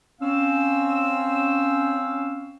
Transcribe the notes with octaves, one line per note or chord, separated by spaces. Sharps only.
C4 C#4 F5 E6